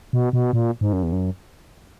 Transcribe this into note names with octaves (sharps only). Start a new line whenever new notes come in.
B2
B2
A#2
G#2
F#2
E2
F#2